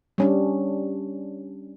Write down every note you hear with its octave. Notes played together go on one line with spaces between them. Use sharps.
G3 C#4 D4